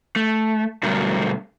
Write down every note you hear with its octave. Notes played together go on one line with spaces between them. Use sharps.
A3
B2 D3 F#3 G3 A3 A#4